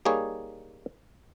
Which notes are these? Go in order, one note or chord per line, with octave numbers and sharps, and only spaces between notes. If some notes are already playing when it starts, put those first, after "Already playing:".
G3 A#3 D#4 G#4 C#5